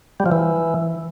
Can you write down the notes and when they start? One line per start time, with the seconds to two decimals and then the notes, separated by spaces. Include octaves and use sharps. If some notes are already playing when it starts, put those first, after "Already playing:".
0.20 G3
0.26 F3
0.32 E3